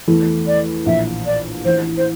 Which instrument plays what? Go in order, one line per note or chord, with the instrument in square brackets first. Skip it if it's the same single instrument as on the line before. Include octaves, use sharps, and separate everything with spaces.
[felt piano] E2 E3 A3
[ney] D5
[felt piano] A#1 A2 E3 [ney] E5
[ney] D5
[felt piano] A1 A2 E3 [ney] C5
[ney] C5